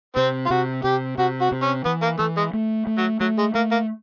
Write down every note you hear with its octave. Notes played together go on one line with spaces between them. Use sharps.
C3 C4
F4
C3 F#4
C3 G4
C3 F#4
F#4
C3
C#4
E3 B3
A#3
E3 A3
G#3
A3
A3
F#3
F#3 A3
G#3
A3 A#3
A#3